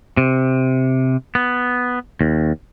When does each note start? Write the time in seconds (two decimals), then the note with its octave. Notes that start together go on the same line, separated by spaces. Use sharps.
0.17 C3
1.35 B3
2.21 D#2